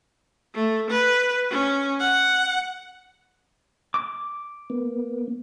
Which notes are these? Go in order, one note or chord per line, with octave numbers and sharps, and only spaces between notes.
A3
B4
C#4
F#5
D6
A#3 B3